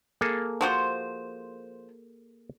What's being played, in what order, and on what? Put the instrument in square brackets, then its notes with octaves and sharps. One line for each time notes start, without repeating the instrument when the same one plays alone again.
[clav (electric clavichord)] A#3 G#4 A4
[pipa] F3 F#4 C5